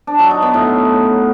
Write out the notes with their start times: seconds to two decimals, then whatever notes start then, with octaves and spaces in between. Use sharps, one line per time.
0.07 D4
0.19 F#3
0.31 D#4
0.42 B3
0.54 A2